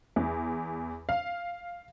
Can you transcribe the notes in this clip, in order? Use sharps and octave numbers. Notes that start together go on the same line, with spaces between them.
E2
F5